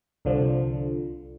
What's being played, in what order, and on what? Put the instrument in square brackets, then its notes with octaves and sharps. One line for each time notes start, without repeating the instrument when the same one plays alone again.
[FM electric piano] C2 D3 F3